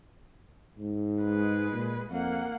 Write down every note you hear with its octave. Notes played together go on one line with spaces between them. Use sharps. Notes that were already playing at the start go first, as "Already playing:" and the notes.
G#2
G#3 B4
A#2
F2 A#3 F#5